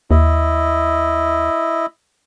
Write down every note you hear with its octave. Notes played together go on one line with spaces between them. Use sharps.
D#2 E4 D#5